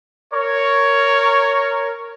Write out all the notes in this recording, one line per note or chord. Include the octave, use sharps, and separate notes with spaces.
A#4 C#5